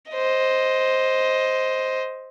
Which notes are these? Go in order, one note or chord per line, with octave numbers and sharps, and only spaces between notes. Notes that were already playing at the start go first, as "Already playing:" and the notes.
C5 D#5